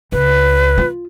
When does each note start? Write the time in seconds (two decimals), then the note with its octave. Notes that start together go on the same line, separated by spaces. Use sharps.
0.12 C#2 B4
0.78 F4